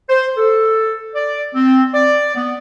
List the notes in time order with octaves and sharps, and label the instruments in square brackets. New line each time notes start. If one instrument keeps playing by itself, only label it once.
[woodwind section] C5
A4
D5
C4
D5
B3